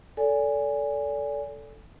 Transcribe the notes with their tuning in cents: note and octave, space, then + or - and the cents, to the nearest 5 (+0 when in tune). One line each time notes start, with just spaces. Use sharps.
A4 +0 D5 -35 G#5 -10